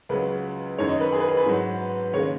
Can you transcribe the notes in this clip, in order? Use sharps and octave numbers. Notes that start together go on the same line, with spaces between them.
C#2 C#3 F#3 B4
F#2 D#3 G#3 C#5
D#5
B4
G#4
B4
G#4
B4
G#2 F#3
D#2 C#3 G#3 C#5